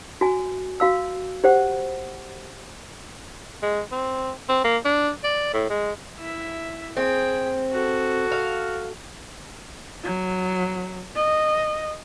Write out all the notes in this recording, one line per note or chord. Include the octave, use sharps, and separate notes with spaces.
F#4 G#5
F#4 F5 E6
G4 C5 F#5
G#3
C4
C4
A#3
D4
D5
A2
G#3
E4 E5
C4 G#4 G5
F#4 A4
F5
F#3
D#5